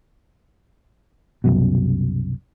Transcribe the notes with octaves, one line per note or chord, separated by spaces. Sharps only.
C2 F#2 B2